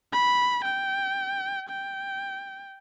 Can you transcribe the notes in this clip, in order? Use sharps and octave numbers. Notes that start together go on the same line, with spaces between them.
B5
G5
G5